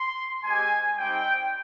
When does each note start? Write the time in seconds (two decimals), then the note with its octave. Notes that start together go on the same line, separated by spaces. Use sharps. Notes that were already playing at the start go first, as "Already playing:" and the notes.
Already playing: C6
0.44 G#3 C4 G4 G#5
0.97 G3 C4 D#4 G5